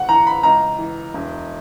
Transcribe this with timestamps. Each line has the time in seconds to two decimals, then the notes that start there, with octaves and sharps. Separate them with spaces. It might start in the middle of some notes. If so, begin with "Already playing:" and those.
Already playing: G1 F#5
0.09 E3 A#5
0.27 B5
0.43 C#2 A#5
0.79 E3
1.14 E1